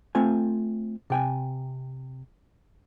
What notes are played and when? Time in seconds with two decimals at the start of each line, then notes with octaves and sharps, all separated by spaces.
0.15 A3 C4 F4 G#5
1.10 C3 G5 G#5